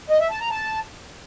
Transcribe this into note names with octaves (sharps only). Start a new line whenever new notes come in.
D#5
E5
A5
A#5
A5